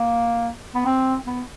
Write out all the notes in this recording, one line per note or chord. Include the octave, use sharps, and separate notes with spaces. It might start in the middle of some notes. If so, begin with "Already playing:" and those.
Already playing: A#3
B3
C4
B3